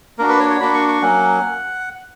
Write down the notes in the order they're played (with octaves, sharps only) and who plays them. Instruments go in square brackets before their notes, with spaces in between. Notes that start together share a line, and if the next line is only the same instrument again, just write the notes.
[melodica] A#3 D4 F#4 A#4
B4
C#5
C#5
A#3 D4 F#4 B5
C#6
C#6
F#3 A#3 C#4 F#5